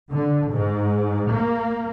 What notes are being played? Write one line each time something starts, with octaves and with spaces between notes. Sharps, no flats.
D3
G#2
A#3